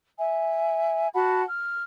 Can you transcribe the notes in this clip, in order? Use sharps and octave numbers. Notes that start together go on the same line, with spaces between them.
E5 G#5
F#4 F#5 A5 B5
F6